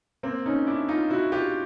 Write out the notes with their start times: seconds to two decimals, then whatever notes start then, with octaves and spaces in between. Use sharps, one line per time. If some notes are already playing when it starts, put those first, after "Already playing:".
0.23 A#3 C4
0.46 C#4 D#4
0.67 D4 E4
0.89 D#4 F4
1.10 E4 F#4
1.32 F4 G4